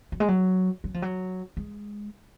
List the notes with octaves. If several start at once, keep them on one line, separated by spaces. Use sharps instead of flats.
F#3
G#3
F#3
F#3
F3
F#3
G#3